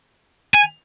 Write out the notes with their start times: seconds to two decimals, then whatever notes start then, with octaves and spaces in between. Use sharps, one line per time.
0.55 G#5